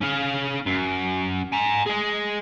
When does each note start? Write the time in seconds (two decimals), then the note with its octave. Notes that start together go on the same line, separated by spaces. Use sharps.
0.02 C#4 F5
0.66 F#2
1.53 G#5 A#5
1.86 G#4 D#5